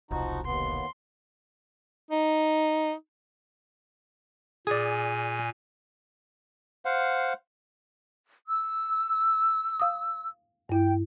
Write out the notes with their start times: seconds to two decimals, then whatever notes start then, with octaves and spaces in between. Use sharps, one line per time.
0.11 E1 C2 F3 D#4 F#4
0.46 D#2 B3 C6
2.11 D#4
4.67 A#2 G#4 D5 G#5
6.85 C5 F5 F#5
8.45 E6
9.80 F5 D#6
10.69 G2 E4 G5